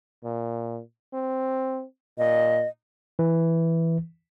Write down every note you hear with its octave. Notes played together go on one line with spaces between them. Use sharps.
A#2
C4
A#2 D#5
E3